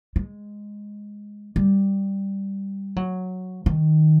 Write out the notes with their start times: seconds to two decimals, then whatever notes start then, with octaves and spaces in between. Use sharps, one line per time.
0.16 G#3
1.56 G3
2.96 F#3
3.66 D#3